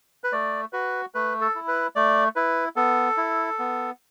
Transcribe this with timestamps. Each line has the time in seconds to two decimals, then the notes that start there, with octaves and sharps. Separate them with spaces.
0.24 B4
0.32 A3 D5
0.73 F#4 B4
1.15 A3 B4
1.41 A4
1.55 E4
1.68 B4
1.96 A3 D5
2.36 E4 B4
2.76 B3 A4
3.17 E4
3.59 B3